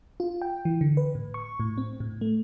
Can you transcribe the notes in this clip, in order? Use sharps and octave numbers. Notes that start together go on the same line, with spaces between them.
F4
G5
E3
D3
B4
A2
C#6
A2
C4
A2
A3